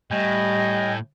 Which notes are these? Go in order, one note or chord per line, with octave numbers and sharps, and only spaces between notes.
A2 G3 D#5 G5 G#5